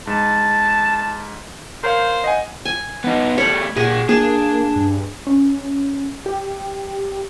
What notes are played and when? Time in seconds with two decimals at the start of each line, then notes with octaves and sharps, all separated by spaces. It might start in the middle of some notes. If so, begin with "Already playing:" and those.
0.07 G#2 A5
1.84 A#4 C5 C#5 F5
2.24 D#5 F#5 G#5
2.65 G#5
3.04 B3 D#4
3.38 G3 A3 C#5 B5
3.77 A#2 G4 G#4 F#5
4.09 A#3 D4 G#4
4.76 G2
5.27 C#4
6.26 G4